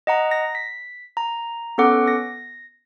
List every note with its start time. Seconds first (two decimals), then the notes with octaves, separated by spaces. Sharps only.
0.07 D#5 F#5 A#5
0.31 A#6
0.55 B6
1.17 A#5
1.78 B3 C#4 A4 F#5 D6
2.08 A#6